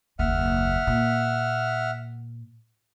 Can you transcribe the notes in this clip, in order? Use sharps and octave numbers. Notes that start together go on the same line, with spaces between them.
F#1 D#2 E5 F#5 F6
A#2